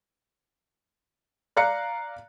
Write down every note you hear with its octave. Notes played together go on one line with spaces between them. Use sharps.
D5 F5 A#5 F#6 C#7